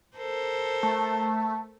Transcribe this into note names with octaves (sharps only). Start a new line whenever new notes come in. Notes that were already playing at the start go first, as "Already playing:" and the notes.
A4 A#4 C5
A3 A5